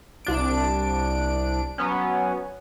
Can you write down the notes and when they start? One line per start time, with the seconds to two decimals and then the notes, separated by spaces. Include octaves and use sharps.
0.25 C2 D4 D7
1.78 F#3 B3 C#4